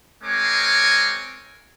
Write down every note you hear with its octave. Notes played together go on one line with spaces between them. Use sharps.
G#3 C4 A#4 C#5 G#5 D6